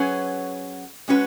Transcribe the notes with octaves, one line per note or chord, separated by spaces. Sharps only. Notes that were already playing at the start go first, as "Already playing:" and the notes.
Already playing: F#3 C#4 G#4 B4
G#3 C#4 F#4 B4